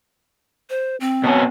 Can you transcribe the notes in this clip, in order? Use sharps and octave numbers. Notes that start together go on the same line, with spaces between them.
C5
C4
B2 B3 C#4